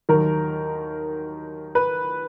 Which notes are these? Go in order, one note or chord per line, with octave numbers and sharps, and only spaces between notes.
D#2 D#3 F#3 A#4
B4